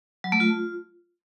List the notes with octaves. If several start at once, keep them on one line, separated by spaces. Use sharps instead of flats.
F#3
A3
F4